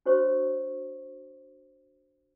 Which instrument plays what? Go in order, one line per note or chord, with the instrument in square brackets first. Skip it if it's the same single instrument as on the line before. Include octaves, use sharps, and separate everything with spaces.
[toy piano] D4 F#4 C5 C#5 C#6